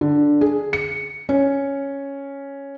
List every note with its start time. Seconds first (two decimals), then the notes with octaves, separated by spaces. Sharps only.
0.01 D3
0.41 G#4
0.73 C#7
1.29 C#4